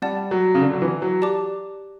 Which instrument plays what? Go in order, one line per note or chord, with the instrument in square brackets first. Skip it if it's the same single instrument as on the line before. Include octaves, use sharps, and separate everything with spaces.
[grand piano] G3 [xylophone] D5 F#5 A5
[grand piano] F#3
C#3
D3
F#3
E3
F#3
[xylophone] G4 D5 A5 D6